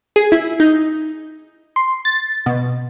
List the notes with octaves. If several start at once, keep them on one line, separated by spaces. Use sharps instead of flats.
G#4
E4
D#4
C6
A6
B2